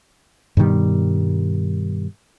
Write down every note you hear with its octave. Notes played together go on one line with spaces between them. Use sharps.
G2 B2 D#3 G3